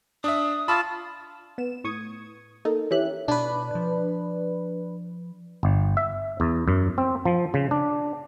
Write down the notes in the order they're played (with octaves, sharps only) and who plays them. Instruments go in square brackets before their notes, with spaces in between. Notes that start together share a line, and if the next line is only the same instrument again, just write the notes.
[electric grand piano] D4 E5 [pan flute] D#6
[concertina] F4 A5 [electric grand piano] B5 C#6 E6
[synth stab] B3 E7
A2 C#6 D#6 G#6
A#3 D#4 A4
E3 C#4 G4 E5 F#6
[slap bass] B2 [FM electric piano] D4 B4
[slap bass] F3
[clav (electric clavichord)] G1
E5
E2
F#2
C4
F3
C#3
D4